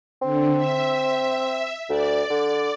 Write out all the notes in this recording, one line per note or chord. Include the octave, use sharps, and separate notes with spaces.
D3 C4
E5
D2 D5
D3